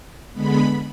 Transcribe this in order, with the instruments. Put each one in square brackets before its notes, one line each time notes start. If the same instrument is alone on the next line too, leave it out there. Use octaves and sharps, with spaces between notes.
[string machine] D3 G#3 B3 B5